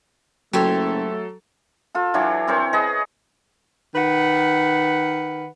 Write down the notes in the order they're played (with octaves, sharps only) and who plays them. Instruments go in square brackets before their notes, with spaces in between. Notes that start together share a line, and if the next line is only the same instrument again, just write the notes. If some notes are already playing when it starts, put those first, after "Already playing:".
[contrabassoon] F#1 [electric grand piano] F#3 A4 [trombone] A3 [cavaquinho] G4 C5 C#5
[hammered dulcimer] F4 A4
E3 F#3 D4 C#5
C4 A#4 C5 C#5
G#4 B4 D#5
[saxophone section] D#3 B4 F#5